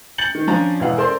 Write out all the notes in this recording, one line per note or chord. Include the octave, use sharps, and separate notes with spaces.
G6 A6 C#7 F#7
D#3
F3 C#4 D4 A#5
E1 E3 G#3 F5 F#5
A4 A#4 C5 D5 C6